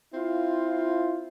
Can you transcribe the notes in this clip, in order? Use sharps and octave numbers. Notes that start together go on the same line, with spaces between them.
C4 E4 F4